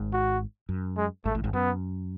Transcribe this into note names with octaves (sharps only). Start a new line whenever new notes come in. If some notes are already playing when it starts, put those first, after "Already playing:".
Already playing: G#1 G#2
F#4
F#2
G#3
G#1 G#2 A3
A1 A2
G#1 G#2
F#2 B3